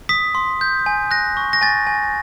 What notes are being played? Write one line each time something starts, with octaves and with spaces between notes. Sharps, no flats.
D#6 B6
C6
G6
G#5
F#6 A#6
C#6
A#6
G#5 A6
G#5